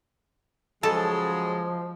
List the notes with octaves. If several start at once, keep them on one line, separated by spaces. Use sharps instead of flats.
C#3 F3 F#3 G#3 A4 A5